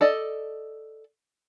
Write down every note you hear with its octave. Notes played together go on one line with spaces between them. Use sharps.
A4 D5 D#5